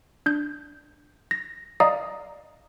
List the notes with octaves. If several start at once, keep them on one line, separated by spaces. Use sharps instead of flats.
D4 G6
A#6
D5 D#5 F5 A#5 D#6